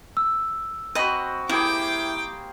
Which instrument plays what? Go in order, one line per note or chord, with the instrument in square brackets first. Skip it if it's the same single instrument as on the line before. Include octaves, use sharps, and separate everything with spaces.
[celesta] E6
[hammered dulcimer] C4 F#4 [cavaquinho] D#5 B5
[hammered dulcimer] A#3 G4 G#4 [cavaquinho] E4 [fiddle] G5 D6